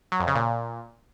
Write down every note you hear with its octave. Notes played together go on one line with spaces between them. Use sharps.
F#3
F2
C#3
A#2